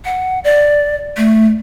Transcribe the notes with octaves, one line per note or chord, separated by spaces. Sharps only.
F#5
D5
A3